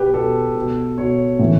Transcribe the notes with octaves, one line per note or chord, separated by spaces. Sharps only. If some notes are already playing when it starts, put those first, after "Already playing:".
Already playing: B2 G4 B4
B2 A4
B2
B2 C#5
A2 E3